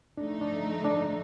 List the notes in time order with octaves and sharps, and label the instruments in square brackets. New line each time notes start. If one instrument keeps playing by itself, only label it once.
[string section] D3 F3 A3 D#4 [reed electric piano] D4
[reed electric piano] D4
D4